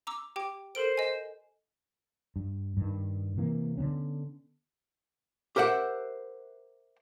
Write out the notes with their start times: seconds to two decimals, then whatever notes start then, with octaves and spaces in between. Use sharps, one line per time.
0.07 A#5 D6 E6
0.36 G4 G5 D6
0.75 A4 A#4 C5 D7
0.97 D#5 G#5
2.36 G2
2.77 G2 D#3
3.37 C3 E3 A#3
3.77 D3 F3 B3 C#4
5.56 G4 A#4 C5 E5 F#5